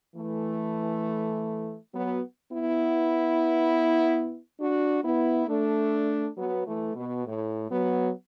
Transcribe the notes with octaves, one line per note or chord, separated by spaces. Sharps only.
E3 A3
F#3 B3
B3 E4
D4 F#4
B3 E4
A3 D4
F#3 B3
E3 A3
B2
A2
F#3 B3